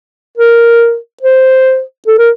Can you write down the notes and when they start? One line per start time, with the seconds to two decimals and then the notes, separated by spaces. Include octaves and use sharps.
0.38 A#4
1.22 C5
2.07 A4
2.18 A#4